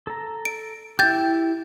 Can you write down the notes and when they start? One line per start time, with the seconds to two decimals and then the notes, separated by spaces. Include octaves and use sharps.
0.07 A4 A#5
0.45 D7
0.99 E4 G4 G6 A6